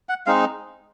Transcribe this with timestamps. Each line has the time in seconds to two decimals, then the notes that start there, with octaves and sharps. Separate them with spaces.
0.09 F#5
0.26 G#3 C4 D#4 F5